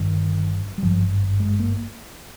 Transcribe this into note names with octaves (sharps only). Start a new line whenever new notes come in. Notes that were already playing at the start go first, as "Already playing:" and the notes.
Already playing: G1 G2 D#3
G3
G#1 G2 F3
G#3
A#3